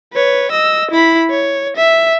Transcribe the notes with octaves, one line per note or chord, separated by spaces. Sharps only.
B4 C#5
D#5 E6
E4 B5
C#5
E5